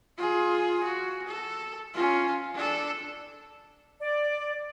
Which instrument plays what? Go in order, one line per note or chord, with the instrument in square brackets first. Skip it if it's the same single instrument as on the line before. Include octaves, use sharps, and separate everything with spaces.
[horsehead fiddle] F4 G#4
F#4
A4
C#4 F4
D4 A4
[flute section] D5